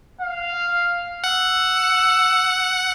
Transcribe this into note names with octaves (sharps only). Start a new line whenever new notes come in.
F5
F#5 E6